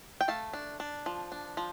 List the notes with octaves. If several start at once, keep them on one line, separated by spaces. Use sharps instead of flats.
G5
A3 F5 A5
D4
D4
F3
D4
F3